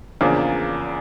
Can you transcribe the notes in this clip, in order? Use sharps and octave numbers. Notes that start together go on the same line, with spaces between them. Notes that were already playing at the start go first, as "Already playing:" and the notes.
E2 C#3 F3 A#3 D4